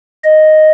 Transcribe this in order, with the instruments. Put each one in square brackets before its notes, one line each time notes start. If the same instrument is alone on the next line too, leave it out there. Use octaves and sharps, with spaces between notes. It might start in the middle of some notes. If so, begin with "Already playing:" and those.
[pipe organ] D#5